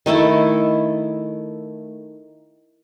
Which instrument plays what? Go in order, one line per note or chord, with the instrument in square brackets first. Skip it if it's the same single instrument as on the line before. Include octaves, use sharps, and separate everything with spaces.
[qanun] D#3 A3 E4 A4